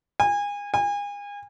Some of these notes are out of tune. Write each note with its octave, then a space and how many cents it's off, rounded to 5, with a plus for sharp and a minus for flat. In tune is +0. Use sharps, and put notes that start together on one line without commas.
G#5 -30
G#5 -35